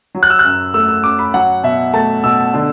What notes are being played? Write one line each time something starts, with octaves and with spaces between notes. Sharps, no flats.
F#3
F#6
E6
F#6
F#2
A3 E6
E6
F#2 D6
B5
F#3 F#5
B2 E5
A3 A5
B2 E6
D3